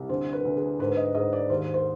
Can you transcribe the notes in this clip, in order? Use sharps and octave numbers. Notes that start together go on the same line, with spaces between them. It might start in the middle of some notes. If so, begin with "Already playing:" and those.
Already playing: C2
D2 C5
B4
D2
G#4
G#2 B4
D#5
G#2 D#5
D5
D#2 C5
C5